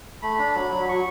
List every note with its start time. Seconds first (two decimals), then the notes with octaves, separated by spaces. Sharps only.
0.22 A3 B5
0.39 D4
0.55 F#3
0.71 F#3
0.89 F#3 C#6